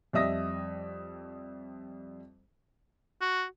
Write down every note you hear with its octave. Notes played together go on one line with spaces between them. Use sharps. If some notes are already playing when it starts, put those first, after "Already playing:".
F2 G3 D#5 E5 D#6 A#6
F#4